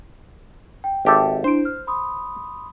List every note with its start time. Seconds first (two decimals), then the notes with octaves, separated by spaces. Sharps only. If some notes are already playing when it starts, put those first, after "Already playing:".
0.84 G5
1.05 G#1 G4 A4 E5 G5
1.44 D4 E4 C5 D7
1.65 F6
1.87 B5 C6 D#6